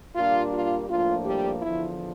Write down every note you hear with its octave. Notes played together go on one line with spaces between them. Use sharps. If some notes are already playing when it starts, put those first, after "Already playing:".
A#2 G3 A#3 D4 F4
F4
A2 F3 A#3 D4 F4
G3 G4
E2 D3 F3 E4